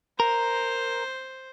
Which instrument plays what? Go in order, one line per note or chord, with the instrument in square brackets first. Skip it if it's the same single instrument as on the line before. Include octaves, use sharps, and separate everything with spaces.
[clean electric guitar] A#4 [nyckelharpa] C5